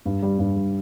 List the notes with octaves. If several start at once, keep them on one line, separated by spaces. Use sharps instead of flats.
G2
G3
G2
G3